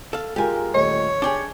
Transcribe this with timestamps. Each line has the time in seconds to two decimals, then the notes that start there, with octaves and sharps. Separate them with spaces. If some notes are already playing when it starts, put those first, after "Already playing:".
0.13 A4 F5
0.36 G#3 F4 G4 A#4 G#5
0.74 D#1 A3 C#5 D#5
1.22 D4 G4 G#4 G7